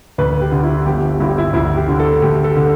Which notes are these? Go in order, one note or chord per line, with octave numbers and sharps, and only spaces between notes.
D2 B4
G4
D3
E4
G1 G4
G2 D3 E4
G4
E4
D2 E4
G4
D3
A4
D2 G4
A4
D3